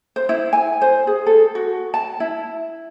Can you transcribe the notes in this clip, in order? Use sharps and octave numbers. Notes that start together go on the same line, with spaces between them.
C5
E4
G#5
C5
G#4
A4
F#4
A5
E4